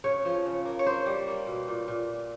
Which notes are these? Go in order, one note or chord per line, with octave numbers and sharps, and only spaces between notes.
C#3 C#5
F3
C#3
A#3
C#5
A#3 C5
G3
A#3
B2
A#2
A#2